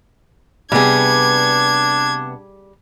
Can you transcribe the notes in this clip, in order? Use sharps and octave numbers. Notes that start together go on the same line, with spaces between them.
C3 G3 B3 D4 G#4 G#6